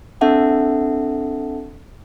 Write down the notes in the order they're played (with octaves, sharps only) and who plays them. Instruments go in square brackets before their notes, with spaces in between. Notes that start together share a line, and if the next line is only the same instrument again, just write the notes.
[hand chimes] C4 D4 A4 E5 F#5 A5